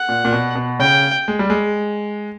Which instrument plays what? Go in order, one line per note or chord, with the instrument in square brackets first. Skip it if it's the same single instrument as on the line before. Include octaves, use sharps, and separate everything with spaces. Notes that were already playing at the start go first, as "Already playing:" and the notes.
Already playing: [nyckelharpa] F#5
[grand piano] A#2
A#2
B2
B2
[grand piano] C#3 [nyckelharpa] G5
[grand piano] G#3
G3
G#3